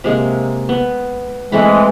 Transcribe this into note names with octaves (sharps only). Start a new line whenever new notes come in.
C3 G#3 A#3
B3
E3 G#3 A3 C4 B5